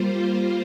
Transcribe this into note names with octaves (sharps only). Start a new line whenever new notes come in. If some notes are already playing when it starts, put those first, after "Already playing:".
Already playing: G3 A#3 F4 C5